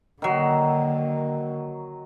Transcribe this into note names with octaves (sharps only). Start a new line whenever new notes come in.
D3 D#3 F#3 A#3